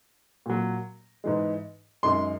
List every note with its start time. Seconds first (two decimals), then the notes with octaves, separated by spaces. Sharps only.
0.46 A#2 F#3
1.24 G#2 E3 G#3
2.03 F#2 D#3 G#3 C6